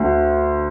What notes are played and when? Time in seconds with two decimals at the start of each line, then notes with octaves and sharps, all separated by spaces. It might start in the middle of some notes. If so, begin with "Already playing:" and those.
Already playing: D2